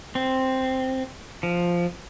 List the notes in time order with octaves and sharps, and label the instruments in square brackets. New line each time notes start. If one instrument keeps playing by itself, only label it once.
[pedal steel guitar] C4
F3